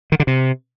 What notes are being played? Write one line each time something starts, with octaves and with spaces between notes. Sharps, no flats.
D#3
D3
C3